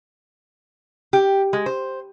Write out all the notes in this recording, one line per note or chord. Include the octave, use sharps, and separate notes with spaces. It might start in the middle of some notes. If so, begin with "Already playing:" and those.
G4
G#3
C5